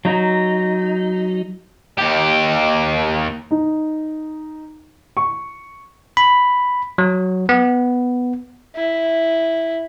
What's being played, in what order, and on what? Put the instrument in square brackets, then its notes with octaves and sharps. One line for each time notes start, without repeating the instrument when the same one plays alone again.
[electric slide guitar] F#3 D#4
[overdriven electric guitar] D#2 G4
[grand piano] D#4
C#6
[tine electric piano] B5
F#3
B3
[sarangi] E4